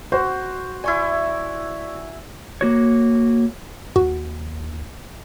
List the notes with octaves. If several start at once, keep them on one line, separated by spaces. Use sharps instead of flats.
F#4 C5
E4 D5 G#5 C#6 G#6
A#3 F#4 C#5
D#2 F#4